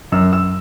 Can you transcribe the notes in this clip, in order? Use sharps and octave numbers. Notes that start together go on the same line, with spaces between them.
F#2 E6
F#2 E6